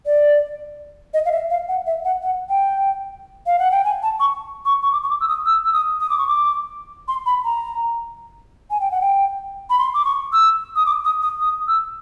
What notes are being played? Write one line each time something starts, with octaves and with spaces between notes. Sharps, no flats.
D5
D#5
F5
E5
F5
F#5
E5
F#5
F#5
G5
F5
F#5
G5
G#5
A5
C#6
C#6
C#6
D6
C#6
D6
E6
D#6
E6
E6
D#6
D#6
D6
C#6
D6
C6
B5
A#5
G#5
G5
F#5
G5
B5
C6
D6
C#6
E6
D#6
D6
D#6
D#6
D#6
E6